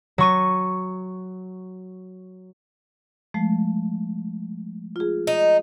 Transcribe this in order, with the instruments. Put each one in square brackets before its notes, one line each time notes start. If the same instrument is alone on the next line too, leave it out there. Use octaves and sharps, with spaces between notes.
[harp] F#3 C#6 D#7
[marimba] F3 G#3 A3
F4 G#4
[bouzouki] D#4